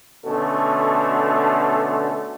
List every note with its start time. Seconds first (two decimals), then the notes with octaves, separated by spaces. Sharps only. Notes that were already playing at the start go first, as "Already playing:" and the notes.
0.25 B2 D3 A3 C#4 A4